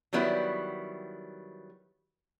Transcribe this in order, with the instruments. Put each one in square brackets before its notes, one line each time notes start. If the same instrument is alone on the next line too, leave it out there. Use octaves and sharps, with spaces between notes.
[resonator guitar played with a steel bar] D#3 F#3 G3 B3 E4